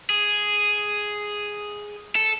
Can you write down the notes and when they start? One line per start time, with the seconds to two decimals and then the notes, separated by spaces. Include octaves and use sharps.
0.10 G#4
2.15 A4